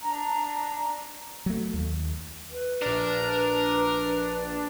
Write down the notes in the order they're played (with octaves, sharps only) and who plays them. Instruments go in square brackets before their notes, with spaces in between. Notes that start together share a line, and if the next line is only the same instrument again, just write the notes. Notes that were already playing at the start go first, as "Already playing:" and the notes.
[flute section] D4 A#5
[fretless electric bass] F#3 A3
D#2
[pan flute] B4
[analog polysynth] A#1 D4 [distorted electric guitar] A#4